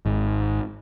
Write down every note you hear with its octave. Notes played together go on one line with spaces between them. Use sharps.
G#1